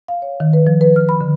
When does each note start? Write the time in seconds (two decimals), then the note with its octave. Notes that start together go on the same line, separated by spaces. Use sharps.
0.08 F5
0.22 C#5
0.40 D#3
0.53 B4
0.67 F3
0.81 B4
0.96 F6
1.09 B5
1.21 D3